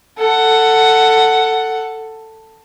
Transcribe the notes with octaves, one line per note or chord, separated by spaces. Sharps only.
A4 F#5